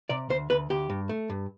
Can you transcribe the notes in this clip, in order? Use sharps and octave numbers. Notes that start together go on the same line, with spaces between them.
C3 D5
D2 C5
D2 B4
D2 G4
G2
A3
G2